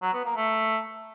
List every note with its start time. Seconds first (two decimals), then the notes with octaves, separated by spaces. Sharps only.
0.02 F#3
0.13 B3
0.25 A#3
0.36 A3